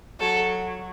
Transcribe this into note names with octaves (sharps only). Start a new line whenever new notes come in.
F#3 A4